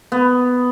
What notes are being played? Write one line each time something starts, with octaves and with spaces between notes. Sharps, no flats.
B3